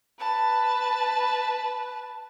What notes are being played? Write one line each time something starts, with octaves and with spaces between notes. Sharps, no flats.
B4 A5